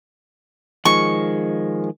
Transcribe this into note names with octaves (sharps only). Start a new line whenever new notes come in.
D#3 F3 G#3 C#6